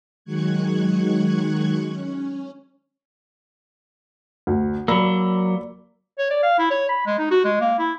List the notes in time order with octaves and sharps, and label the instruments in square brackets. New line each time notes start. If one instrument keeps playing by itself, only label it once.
[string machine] D#3 F#3 G#3 C#6 F#6 G#6
C#4
[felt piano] D2
[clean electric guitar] F#3 A#3 [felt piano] D5 B5 E6
[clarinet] C#5
D5
F5
E4
C#5
B5
G#3
D#4
F#4
G#3
A#3
E4